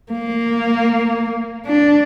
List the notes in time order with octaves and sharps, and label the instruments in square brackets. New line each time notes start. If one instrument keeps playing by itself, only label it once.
[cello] A#3
D4